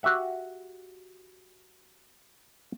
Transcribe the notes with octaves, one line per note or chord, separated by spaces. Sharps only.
F#4 G4 E5 F#5